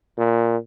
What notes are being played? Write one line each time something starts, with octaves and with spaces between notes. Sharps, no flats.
A#2